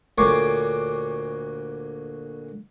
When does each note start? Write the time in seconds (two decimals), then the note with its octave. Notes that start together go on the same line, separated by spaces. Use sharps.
0.18 D2 A#2 C#5 C6 D6